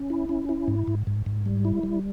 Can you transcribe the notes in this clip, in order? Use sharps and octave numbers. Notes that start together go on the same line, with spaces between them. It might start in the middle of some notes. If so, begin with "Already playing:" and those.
Already playing: C#4
E4
C#4
E4
G#2
G#2
G#2
G#2
G3
E4
G3